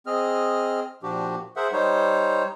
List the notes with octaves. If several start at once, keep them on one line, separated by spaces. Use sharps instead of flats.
C4 G#4 D#5 F6
A#2 F3 D4 F#4 G4
G#4 A#4 C5 E5 F#5
G3 D#4 C5 C#5